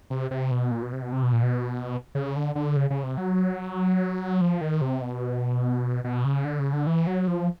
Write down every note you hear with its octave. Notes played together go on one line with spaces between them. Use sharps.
C3
C3
B2
A#2
B2
C3
B2
C3
B2
A#2
B2
C#3
D3
D3
C#3
C#3
C3
F#3
F3
D#3
C3
B2
B2
C#3
D3
C#3
D3
E3
F#3
F3